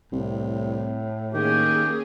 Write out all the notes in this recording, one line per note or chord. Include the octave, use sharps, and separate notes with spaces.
C2 A2
D#3 A#3 C#4 G4 G#4